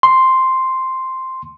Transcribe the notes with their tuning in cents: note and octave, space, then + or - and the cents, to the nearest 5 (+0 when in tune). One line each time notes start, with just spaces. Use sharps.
C6 +0